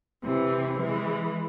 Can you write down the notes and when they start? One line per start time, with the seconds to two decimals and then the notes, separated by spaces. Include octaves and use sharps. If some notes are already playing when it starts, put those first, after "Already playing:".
0.24 C3 E3
0.80 E3 G#3